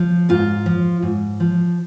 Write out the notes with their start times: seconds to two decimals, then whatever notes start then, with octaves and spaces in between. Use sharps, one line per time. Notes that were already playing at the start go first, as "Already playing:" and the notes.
Already playing: F3
0.29 G#2 F4
0.66 F3
1.02 G#2
1.40 F3